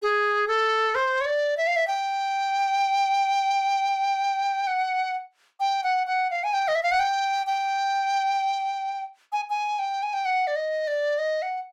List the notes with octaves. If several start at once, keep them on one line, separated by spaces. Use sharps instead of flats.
G#4
A4
C5
C#5
D5
E5
F5
E5
G5
F#5
G5
F#5
F#5
F5
G#5
G5
D#5
E5
F5
F#5
G5
G5
G#5
G#5
G5
G#5
G5
F#5
D5
D#5
D5
D#5
F#5